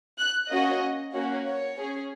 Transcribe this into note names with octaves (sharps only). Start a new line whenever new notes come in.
F#6
A#3 C#4 F#4 D#5
A#3 C#4 F#4
C#5
C#4 G#4